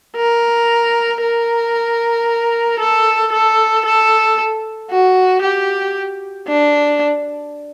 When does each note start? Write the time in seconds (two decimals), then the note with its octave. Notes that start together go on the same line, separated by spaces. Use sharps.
0.16 A#4
1.22 A#4
2.79 A4
3.32 A4
3.85 A4
4.90 F#4
5.42 G4
6.48 D4